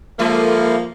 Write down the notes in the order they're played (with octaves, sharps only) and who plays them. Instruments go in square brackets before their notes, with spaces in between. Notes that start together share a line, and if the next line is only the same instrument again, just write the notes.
[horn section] F3 A#3 [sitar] G3 A4 E5